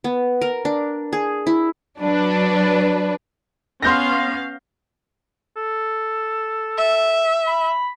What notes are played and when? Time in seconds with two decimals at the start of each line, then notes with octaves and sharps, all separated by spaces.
0.04 B3
0.41 A#4
0.65 D4
1.13 G#4
1.47 E4
1.99 F#3 D4 B4
3.83 B3 C#4 F5 C6 G6 A#6
5.57 A4
6.78 E5
7.47 B5